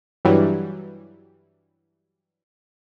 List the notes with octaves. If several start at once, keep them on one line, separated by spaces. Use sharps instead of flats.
G2 E3 F#3 G3